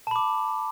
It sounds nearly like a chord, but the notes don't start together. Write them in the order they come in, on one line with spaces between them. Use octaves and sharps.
A5 B5 D6